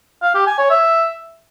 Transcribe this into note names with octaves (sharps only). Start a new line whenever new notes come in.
F5
G4
G#5
C#5
E5